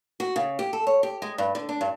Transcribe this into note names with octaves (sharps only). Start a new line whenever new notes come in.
F#4
C#3
G4
A4
C#5
G4
G#3
G2
D3
D4
G2